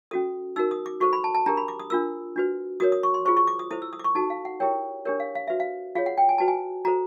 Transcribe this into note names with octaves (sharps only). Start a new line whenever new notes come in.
C#4 F#4 A4 D#6
D#4 F#4 A#4 E6
D#6
D6
F#4 A4 C5 C#6
B5
A5
A5
D4 G4 A#4 A#5
B5
D6
D#6
D4 F4 A#4 E6
D4 F#4 B4
F#4 A#4 C#5 D#6
D#6
C#6
C6
F4 G#4 C5 C#6
C#6
D6
D#6
E4 A4 C5 D#6
E6
D#6
D6
C#6
D#4 F#4 A4 A5
F5
F#5
E4 G4 A#4 C#5 G5
D4 G4 A#4 C#5
F5
F5
F#4 B4 E5
F5
F4 G#4 C#5 F5
F#5
G5
G#5
F#4 B4 A5
G#5
F#4 A4 C5 A#5